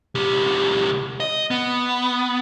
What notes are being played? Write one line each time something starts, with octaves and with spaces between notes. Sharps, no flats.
C#2 G4
D#5
B3